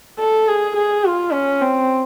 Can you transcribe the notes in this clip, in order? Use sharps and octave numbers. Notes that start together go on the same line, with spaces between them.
A4
G#4
G#4
F4
C#4
C4